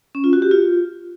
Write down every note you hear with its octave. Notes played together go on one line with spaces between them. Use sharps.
C#4
F4
F#4
G4
F4